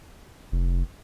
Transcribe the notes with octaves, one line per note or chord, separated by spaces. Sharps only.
F1